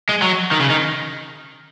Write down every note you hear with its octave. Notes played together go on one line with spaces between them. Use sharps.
G#3
F#3
D#3
C#3
D#3